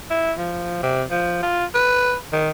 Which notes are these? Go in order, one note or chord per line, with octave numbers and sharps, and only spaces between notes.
E4
F3
C3
F3
F4
B4
D#3